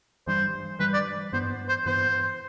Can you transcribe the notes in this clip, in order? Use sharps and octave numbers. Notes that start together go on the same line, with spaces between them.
G2 E3 G3 C5
G2 E3 G3 B4
D5
G2 E3 B3 C5
C5
G2 E3 B3 C5